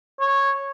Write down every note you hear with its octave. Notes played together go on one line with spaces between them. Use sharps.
C#5